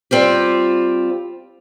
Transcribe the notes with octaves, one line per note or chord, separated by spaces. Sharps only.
G3 C4 F4 G4